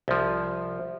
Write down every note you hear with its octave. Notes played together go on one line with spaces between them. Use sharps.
C2 F3